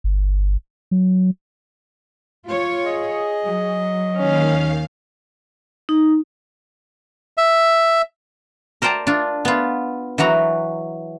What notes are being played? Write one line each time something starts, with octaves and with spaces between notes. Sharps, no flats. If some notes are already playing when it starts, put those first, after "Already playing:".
G1
F#3
F4 C#5
G#4 D#5
F#3
D#2 D#3 C#4 F5
D#4
E5
A#4 C5 D5 G5 A5 A#5
D4 F4
B3 F4
E3 F#3 F#4 A#5